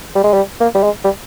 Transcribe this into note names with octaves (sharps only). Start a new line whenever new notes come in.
G3
G#3
G3
A#3
G3
G#3
G3